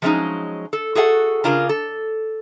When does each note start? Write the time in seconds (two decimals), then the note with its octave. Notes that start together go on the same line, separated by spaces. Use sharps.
0.02 F3 F#3 G#3 C4 C#4 D#4
0.73 A4
0.95 F#4 G#4 A4 F5 F#5
1.44 C#3 D4 F4 G#4 A#4
1.69 A4